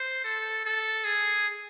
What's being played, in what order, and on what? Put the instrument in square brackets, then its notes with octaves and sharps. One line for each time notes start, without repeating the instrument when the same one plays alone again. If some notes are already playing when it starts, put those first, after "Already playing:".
Already playing: [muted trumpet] C5
A4
A4
G#4